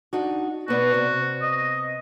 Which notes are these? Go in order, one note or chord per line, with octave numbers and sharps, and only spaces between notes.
D4 D#4 F#4
B2 B3 F#4 D5
C3
D#5